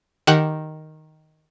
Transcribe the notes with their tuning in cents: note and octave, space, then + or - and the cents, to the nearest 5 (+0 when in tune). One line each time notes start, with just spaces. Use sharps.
D#3 +0 G4 +0 F#5 +0